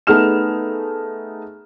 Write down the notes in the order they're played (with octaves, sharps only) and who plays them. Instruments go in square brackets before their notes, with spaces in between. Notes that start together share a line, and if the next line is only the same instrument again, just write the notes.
[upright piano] A3 B3 D#4 G#4 F6 E7